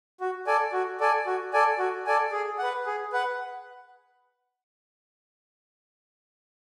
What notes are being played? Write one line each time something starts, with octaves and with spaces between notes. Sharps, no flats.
F#4
A4 D5 G#5
F#4
A4 D5 G#5
F#4
A4 D5 G#5
F#4
A4 D5 G#5
G#4
B4 F#5
G#4
B4 F#5